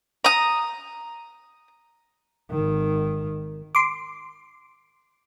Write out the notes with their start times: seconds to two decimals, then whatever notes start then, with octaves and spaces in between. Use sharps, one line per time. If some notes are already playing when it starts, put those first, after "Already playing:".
0.24 A#5 D#6
2.51 G#1 D#3
3.75 C6 D6